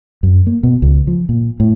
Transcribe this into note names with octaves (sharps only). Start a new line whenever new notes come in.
F#2
A#3
B2
C#2
F3
A#2
A2